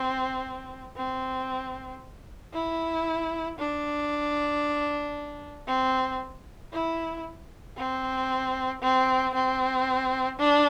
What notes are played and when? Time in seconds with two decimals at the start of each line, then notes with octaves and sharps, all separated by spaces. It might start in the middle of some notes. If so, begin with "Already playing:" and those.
Already playing: C4
0.96 C4
2.53 E4
3.58 D4
5.67 C4
6.72 E4
7.76 C4
8.81 C4
9.34 C4
10.38 D4